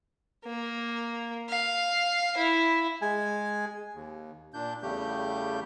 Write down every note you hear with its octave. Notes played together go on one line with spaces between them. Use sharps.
A#3
F5
E4
G#3 G#5
D#2
A#2 D4 G6
E2 C#3 G3 A3 G4 G6